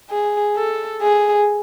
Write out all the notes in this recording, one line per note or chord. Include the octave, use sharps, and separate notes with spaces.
G#4
A4
G#4